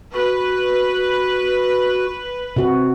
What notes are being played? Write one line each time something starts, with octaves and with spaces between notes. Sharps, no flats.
F#4 B4
C3 F#4